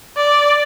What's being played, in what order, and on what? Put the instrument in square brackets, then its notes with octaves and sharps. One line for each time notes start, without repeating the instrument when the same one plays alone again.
[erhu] D5